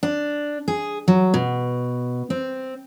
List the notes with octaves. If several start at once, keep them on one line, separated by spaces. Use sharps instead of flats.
D4
G#4
F#3
B2
C4